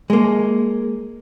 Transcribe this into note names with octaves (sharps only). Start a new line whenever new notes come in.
G#3 A#3